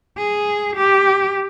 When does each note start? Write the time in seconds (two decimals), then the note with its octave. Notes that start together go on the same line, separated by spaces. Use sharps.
0.17 G#4
0.76 G4